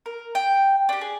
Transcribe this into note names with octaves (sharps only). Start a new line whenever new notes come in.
A#4
G5
D4 G4
G#4